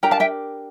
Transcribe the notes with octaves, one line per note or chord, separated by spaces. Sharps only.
D4 G4 A#4 G5 A#5
F5 A5
E5 G5